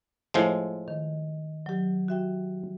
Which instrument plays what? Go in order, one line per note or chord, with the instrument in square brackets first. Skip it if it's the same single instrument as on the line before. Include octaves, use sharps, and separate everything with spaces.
[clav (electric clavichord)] A2 F3 G#3
[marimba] D#3
F#3 G4
F#4 E5 G5